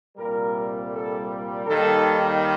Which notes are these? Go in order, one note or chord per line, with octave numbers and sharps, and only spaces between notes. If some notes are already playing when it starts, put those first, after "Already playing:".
C2 A#2 G3 A#4
A4
D#2 D#3 G3 A4